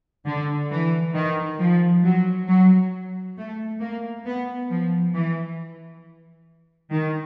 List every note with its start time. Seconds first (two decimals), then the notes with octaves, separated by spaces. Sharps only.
0.26 D3
0.71 E3
1.15 D#3
1.59 F3
2.04 F#3
2.48 F#3
3.37 A3
3.81 A#3
4.25 B3
4.70 F3
5.14 E3
6.92 D#3